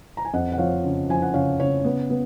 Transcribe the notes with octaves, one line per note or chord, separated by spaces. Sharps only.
A#5
G#5
F2 D#5 F#5
F#5
F3 C#5 F5
C#3
F3 G#5
F#5
C#3 C#5 F5
C#3 C#5
B3
B3